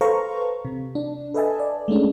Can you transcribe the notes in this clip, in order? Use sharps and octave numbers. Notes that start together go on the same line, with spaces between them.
A4 B4 C5 F5 A#5 C#6
C3
D4
A4 B4 D#5 E5 G#5 A5
D5
G#3 A3 C#4 D4